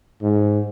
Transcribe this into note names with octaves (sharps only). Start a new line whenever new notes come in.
G#2